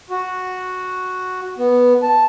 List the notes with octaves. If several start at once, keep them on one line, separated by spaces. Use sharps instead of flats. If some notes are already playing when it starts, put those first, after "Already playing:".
F#4
B3
A5